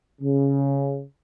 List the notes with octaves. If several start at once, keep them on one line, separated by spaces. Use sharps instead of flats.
C#3